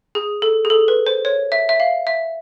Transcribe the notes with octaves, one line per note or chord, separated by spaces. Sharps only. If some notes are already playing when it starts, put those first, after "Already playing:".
G#4
A4
G#4
A4
B4
C5
C#5
E5
E5
F5
E5